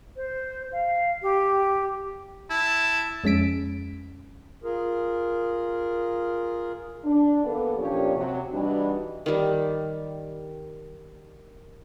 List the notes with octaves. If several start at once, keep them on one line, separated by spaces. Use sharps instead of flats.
C5
F5
G4
E4 A5
F2 G#3 C#4 B6 D7
F4 G#4 A#4
D4
E3 A#3 B3 G4 A4
A#2 F3 C#4 D4 G4 C#5
C3 F#3
E3 G3 D4 D#4 F#4
D#3 G3